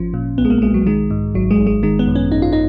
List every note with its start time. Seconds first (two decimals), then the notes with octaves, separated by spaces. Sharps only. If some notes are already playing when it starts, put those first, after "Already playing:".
Already playing: G#1 F3 C#4
0.14 A#2
0.38 B1 B3
0.45 G#3
0.50 A#3
0.62 B1 G#3
0.74 F#3
0.86 D#3 G#3
1.11 G#2
1.35 G#1 F#3
1.51 G#3
1.59 G#1
1.67 G#3
1.83 D#3 G#3
1.99 B3
2.07 F#2
2.15 C#4
2.32 G#1 D#4
2.42 F4
2.53 D#4